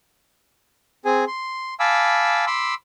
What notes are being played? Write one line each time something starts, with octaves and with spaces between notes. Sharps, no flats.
C4 G#4 G#5
C6
F5 G#5 A5 B5 D6 E6
B5 C6 D6 E6